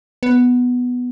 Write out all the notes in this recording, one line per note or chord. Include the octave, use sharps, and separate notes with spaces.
B3